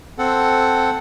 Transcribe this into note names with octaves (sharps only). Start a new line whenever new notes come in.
C4 A4 F#5